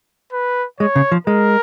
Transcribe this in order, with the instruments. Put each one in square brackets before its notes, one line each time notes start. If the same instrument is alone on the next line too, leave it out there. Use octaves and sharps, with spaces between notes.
[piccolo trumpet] B4
[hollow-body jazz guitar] G#3 [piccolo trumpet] C#5
[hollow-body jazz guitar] C#3
F3
[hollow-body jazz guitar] G#3 [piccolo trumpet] A#4